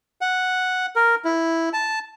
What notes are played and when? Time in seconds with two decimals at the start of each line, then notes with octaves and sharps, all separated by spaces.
0.21 F#5
0.96 A#4
1.25 E4
1.73 A5